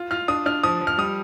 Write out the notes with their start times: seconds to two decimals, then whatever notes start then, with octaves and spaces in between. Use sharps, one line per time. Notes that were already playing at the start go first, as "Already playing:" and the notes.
Already playing: F4
0.11 F4 F6
0.28 D4 D#6
0.46 D4 F6
0.64 F3 D#6
0.81 F3
0.87 F6
0.98 G3 D#6